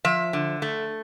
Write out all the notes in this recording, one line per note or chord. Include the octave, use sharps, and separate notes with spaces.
F3 E5
D3
A3